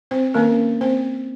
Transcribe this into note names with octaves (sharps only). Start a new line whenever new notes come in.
C4 C5
D#3 A#3 C#4 A#4
C4 C5